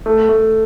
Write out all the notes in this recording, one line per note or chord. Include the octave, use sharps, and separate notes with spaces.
A3
A3